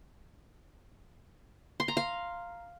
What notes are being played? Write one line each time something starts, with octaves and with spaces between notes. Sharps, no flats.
C6
A#5
F5